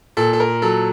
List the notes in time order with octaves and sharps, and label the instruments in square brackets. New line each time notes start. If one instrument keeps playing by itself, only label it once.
[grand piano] A#2 A4
A4
A#4
F#3 A4